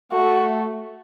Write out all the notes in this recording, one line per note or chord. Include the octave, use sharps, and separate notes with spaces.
A3 F#4